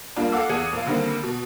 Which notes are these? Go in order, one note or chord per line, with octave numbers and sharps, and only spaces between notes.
G3 A#3 D4 F4
A4 F5 F#5 D6 E6
E2 G#4 F#5 G#6 D#7
A#1 F5
D3 D#3 G3 A#3 C4
B2